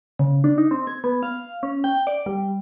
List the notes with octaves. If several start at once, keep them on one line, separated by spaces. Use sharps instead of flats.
C#3
D4
D#4
C4
G#6
B3
F5
C#4
G5
D5
G3